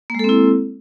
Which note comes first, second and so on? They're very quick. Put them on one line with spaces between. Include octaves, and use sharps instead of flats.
A#3 G#3 A4 C4 E4